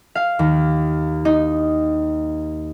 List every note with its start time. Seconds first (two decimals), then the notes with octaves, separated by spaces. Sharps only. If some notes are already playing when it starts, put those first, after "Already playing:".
0.15 F5
0.39 D#2
1.25 D#4